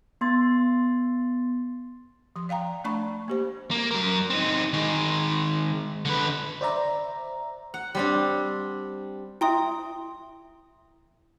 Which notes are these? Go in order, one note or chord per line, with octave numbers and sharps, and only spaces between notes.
B3 C6 A6
F3 C6
D5 F5 G5 A#5
A3 D4 D5 A5 B5 C#6
A#3 G4 C5
A#3
F#3 A#4
C4 D#4
D#3 G#3
D3 B4
C5 D5 E5 A#5
F#5
G3 C4 D4
E4 E5 G5 C6 D#6